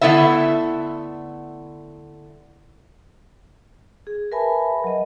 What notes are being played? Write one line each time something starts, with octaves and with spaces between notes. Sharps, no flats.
D3 A3 B3 E4 E5
G#4
A#4 B4 E5 G#5 A5 B5
F#3 D#5